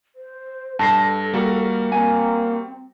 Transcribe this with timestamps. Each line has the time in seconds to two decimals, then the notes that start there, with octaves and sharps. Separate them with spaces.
0.15 C5
0.79 G2 A4 A5 A#6 C7
1.34 G3 A#3 F#4
1.92 A#3 C4 G#5